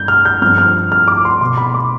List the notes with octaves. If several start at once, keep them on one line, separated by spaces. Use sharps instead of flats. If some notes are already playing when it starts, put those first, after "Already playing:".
Already playing: G2 G6
F6
G6
G2 F3 C4 F6
F6
F6
D6
C6
B2 B3 C6
B5
D6